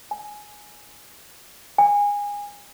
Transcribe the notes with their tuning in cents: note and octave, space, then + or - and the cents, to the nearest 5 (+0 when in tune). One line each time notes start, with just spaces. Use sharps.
G#5 +10
G#5 -25